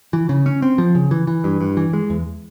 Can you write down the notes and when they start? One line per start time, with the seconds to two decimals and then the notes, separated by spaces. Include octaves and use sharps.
0.13 E3
0.29 C#3
0.46 C#4
0.62 C4
0.78 F3
0.95 C#3
1.11 E3
1.27 E3
1.44 G2
1.61 G2
1.77 E3
1.93 G#3
2.10 E2